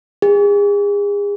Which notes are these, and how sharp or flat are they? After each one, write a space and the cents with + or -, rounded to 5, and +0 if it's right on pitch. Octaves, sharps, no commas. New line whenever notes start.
G#4 -35